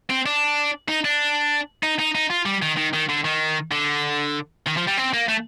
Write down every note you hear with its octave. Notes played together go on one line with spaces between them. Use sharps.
C4
D4
D#4
D4
D#4
D#4
D#4
F4
G3
D#3
D#3
D#3
D3
D#3
D3
D#3
F3
G3
C4
A#3
A3